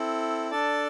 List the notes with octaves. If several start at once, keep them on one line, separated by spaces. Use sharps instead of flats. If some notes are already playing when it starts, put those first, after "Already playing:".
Already playing: C4 E4 A4
D4 A4 D5 A5